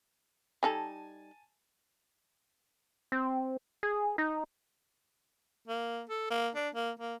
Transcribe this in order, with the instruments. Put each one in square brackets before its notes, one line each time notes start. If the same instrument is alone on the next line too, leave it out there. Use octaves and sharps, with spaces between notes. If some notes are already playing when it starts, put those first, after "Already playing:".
[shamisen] G3 D#4 A4 [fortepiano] G#5 A5
[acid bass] C4
G#4
D#4
[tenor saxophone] A#3
A4
A#3
D4
A#3
A#3